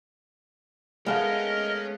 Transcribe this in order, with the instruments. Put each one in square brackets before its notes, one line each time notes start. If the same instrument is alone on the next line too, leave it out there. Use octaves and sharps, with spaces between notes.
[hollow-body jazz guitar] G#3 A3 [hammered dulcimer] B3 F5 [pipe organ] A#4 D#5 [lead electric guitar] C#5 G#5